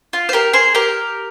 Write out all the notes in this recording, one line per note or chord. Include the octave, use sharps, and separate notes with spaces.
F4
C5
G4 A#4
G#4 C5
G4 A#4